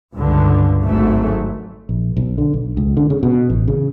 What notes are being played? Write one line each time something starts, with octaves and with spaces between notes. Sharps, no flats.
C#2 G2 D3
G#1 G#2 F#3 A3
A#1
B1
D3
B1
C#2
D3
C#3
B2
A1
C#3